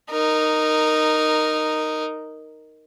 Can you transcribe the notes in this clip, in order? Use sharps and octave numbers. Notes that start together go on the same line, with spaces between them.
D#4 A#4